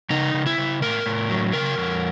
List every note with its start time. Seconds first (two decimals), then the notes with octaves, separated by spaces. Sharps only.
0.10 C#3 D#4
0.34 C#3
0.46 E4
0.58 C#3
0.82 A2 A#4
1.06 A2
1.30 F#3
1.53 C#3 A#4
1.78 F2